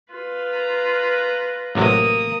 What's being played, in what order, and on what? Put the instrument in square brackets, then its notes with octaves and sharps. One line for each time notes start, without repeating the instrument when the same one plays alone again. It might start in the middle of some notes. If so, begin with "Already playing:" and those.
[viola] F4 B4
[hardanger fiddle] A#5
[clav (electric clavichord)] A1 C3 F#3 [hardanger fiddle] A#3 D#6